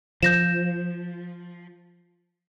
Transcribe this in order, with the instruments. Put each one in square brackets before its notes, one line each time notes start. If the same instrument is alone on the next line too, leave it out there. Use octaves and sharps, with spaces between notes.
[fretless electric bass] F3 [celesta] G6 A#6 E7